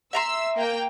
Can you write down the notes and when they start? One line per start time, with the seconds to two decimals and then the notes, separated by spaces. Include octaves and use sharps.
0.13 E5 A#5 C6 E6
0.57 A#3 G5